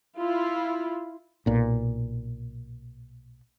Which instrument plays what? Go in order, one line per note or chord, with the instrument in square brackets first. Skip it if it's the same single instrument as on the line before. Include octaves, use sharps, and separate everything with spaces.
[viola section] E4 F4
[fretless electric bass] B1 A#2